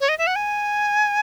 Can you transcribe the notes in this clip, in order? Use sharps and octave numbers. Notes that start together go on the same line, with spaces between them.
C#5
D#5
E5
F#5
G#5